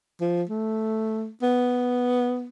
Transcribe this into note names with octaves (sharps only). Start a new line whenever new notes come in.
F3
A3
B3